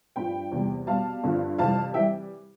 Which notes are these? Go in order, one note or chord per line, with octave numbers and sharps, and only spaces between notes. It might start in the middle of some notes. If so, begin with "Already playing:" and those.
G2 F3 G5 B5
E2 C3 G3
B2 G3 F5 A5
G2 D3 F3
F2 C3 E3 G3 F5 A5
E3 G3 E5 G5